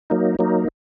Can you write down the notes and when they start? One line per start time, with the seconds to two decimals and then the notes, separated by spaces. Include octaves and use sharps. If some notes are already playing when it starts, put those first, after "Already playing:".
0.10 F#3 A#3 D#4
0.39 F#3 A#3 D#4